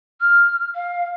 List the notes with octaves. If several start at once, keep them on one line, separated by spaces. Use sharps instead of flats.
F6
F5